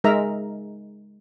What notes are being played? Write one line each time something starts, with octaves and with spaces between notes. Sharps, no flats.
G#3 D#4 A#4 E5 A#5